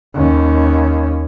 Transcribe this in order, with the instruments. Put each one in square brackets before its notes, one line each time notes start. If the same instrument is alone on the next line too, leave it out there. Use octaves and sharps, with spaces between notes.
[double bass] D#2 C#4